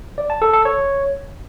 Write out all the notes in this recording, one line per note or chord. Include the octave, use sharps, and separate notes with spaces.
D5
A5
A4
A4
C#5